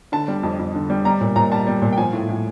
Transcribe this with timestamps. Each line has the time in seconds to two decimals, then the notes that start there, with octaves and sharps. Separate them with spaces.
0.12 D3 A5
0.28 G3
0.43 F2
0.59 F2
0.75 D3
0.90 G3
1.05 G3 A#5
1.21 A#2
1.36 A#2 A#5
1.51 G3 A5
1.67 G3
1.82 A#2
1.93 G5
1.97 F3 G#5
2.13 A2
2.29 A2